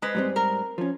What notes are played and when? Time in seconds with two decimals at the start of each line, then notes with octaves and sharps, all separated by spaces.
0.02 G#3 B4 C5
0.15 G#2 G3 C4
0.36 A#4
0.78 F3 C#4